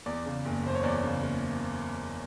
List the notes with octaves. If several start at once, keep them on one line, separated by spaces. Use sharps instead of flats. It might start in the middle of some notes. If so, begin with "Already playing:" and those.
E2 D5
C#3
F#1
F#1 C5
C#5
E2 D5
C#3
F#1